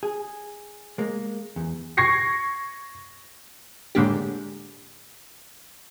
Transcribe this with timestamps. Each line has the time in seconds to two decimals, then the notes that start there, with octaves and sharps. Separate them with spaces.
0.03 G#4
0.98 G#3 A#3
1.56 E2
1.97 C#6 G#6 A#6 C7 C#7
3.95 A2 D3 G#3 A#3 D4 G4